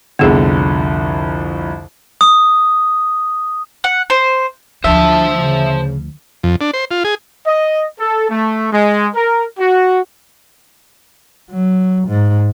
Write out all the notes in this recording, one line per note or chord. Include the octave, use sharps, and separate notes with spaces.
C2 F2 D3 B3 G#4
D#6
F#5
C5
D2 F3 D4 C5 E5 A5
C#3
F2
D4
C5
F4
G#4
D#5
A4
A3
G#3
A#4
F#4
F#3
G#2